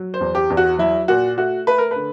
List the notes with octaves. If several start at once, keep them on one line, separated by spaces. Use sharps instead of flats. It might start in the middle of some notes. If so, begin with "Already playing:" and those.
Already playing: F#3
C5
E2
G4
E2
F#4
F#3 E4
A#2 F#4
A3 F#4
A3 B4
A#4
B4
D3